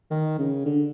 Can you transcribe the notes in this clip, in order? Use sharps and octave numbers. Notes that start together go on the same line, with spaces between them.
D#3
C#3
D3